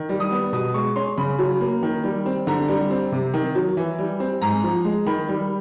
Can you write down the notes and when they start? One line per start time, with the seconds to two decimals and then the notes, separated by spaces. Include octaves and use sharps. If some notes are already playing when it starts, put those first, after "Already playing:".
Already playing: D#3
0.09 G3
0.20 D#6
0.31 B3
0.53 B2 D#6
0.74 G#3 C#6
0.96 C#4 C6
1.17 C#3 B5
1.39 F#3
1.61 A#3
1.83 D#3
2.04 G3
2.26 C4
2.47 D3 A#5
2.69 G3
2.91 C4
3.12 C3
3.34 D#3
3.55 F#3
3.77 E3
3.99 G3
4.20 C4
4.42 G#2 A#5
4.63 F3
4.85 G#3
5.06 D#3 B5
5.29 G3